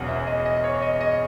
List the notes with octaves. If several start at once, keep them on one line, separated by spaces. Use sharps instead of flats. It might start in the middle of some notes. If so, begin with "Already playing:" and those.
Already playing: E1 E2 C#3 F#3 F#5 G#5
E5
D#5
D#5
C#5
D#5
D#5